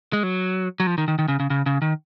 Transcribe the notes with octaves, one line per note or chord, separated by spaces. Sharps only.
G#3
F#3
F#3
F3
D#3
D#3
D#3
C#3
C#3
C#3
C#3
D#3